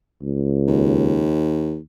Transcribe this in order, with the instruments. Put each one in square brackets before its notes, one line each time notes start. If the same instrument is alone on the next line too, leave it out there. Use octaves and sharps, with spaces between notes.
[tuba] C#2
[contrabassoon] D#2